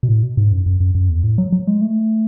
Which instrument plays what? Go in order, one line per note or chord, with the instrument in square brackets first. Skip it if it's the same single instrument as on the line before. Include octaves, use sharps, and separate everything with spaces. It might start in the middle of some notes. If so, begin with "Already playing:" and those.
[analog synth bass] B2
A2
B2
G#2
F#2
F#2
F#2
F#2
E2
A2
F#3
F#3
G#3
A3